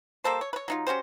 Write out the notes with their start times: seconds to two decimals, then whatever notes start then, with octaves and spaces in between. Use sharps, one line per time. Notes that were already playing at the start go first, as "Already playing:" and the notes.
0.24 G3 A#3 A4 C5
0.41 C#5
0.53 B4 C#5
0.68 F#3 D#4 F4
0.87 C#4 F#4 G4 C5